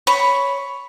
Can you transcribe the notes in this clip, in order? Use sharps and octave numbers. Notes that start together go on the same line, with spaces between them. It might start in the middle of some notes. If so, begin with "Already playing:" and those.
C#5 B5